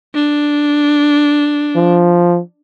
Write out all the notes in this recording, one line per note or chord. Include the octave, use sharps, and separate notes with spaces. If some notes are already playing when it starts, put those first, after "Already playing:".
D4
F3